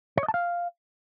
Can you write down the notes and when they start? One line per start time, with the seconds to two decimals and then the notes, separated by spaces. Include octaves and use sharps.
0.17 C#5
0.23 D#5
0.28 A5
0.34 F5